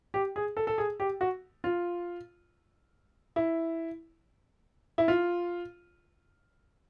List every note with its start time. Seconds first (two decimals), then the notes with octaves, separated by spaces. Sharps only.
0.14 G4
0.36 G#4
0.57 A4
0.67 A4
0.78 G#4
1.00 G4
1.21 F#4
1.64 F4
3.36 E4
4.98 E4
5.08 F4